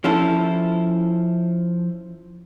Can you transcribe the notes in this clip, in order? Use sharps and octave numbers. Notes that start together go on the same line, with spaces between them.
F3 C#4 E4 A4